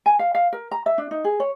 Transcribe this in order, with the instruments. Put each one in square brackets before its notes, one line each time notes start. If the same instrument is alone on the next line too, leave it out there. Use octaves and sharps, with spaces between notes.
[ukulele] G#5
F5
F5
A#4
A#5
E5
D4
D#4
G#4
C#5